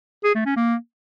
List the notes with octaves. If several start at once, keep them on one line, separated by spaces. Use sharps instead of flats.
G#4
A3
C#4
A#3